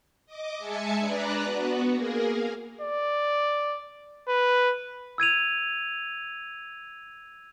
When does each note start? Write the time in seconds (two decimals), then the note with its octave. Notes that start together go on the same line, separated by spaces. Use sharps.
0.26 D#5 D6
0.58 G#3 E5 G#5 A5 C#7
0.98 D4 B4 D5 A#5 F#6
1.42 B3 F#4
1.93 A#3 G#4 A#4
2.24 F5
2.81 D5
4.28 B4
5.18 E6 G#6 D#7 F7